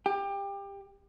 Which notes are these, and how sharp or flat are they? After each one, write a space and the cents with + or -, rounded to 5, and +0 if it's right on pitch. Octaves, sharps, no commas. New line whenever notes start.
G4 +25